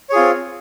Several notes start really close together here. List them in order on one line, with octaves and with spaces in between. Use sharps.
C#5 G#4 F4 C4